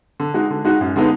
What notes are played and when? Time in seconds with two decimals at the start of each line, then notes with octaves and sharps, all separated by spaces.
0.20 D3
0.34 G#3 D#4 F#4
0.50 D3
0.65 G#3 D#4 F#4
0.81 F#2
0.96 D3 G#3 B3 D#4